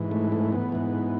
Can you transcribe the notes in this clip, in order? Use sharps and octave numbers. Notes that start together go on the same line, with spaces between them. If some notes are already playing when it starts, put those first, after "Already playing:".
Already playing: G#2 E3
A3
A3
B3
G#2 E3